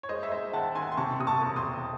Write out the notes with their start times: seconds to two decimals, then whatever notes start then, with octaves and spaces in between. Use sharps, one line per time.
0.03 C#5
0.09 G#3 C5 D#5
0.23 E5
0.31 G#3 C5 D#5
0.53 D#2 F#5 A5
0.75 D#2 G#5 C6
0.92 C6
0.97 C3 A5 C#6
1.20 C3 D#6
1.27 A5 C#6
1.42 E1
1.56 C6 D#6
1.64 E1